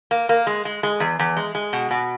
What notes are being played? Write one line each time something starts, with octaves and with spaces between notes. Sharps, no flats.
A#3
A#3
G#3
G#3
G#3
E2
E2
G#3
G#3
B2
B2